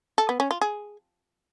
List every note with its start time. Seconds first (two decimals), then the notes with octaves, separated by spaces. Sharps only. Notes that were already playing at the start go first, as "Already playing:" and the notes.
0.18 A4
0.29 B3
0.40 C#4
0.51 F4
0.61 G#4